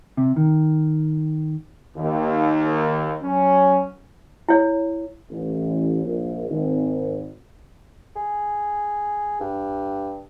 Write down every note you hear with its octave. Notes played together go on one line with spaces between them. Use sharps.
C3
D#3
D#2
F#3 C#4
E4 C#5
A1
A#1
G#1
G#4
G2